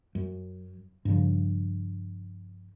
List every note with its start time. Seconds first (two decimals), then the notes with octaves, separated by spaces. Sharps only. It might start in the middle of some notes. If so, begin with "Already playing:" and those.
0.15 F#2
1.05 G2 C#3 F3